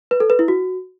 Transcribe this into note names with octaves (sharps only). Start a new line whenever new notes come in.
B4
A4
B4
E4
F#4